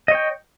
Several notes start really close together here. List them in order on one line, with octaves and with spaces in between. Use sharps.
D#5 C#5 G5